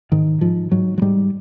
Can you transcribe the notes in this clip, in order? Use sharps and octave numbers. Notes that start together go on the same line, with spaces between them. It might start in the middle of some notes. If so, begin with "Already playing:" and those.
G#2 D#3
G#2 F3
G#2 F#3
F#3
G#2 G3